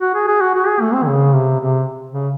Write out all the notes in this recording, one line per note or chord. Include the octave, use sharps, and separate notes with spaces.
F#4
G#4
G#4
F#4
F#4
G#4
A3
C4
D#3
C#3
C3
C3
C#3